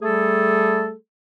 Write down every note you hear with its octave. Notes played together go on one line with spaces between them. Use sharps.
G3 A3 G#4 A4